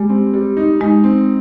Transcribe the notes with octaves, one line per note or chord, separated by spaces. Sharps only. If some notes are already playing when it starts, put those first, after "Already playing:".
Already playing: G3 G#3
C4
G3
D#4
G#3 D#4
C4